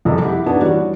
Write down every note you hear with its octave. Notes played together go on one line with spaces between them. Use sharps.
F#1 C2 F2 C3 A4 D#5
E4 G4 F#5
B3 D4 D#4 F#4 G#4
E3 G3 F#4 C#5 D5